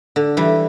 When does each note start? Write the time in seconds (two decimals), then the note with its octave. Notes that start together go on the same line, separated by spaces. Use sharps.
0.16 D3
0.37 E3 G3